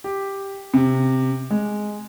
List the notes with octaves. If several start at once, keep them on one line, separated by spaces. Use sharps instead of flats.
G4
C3
G#3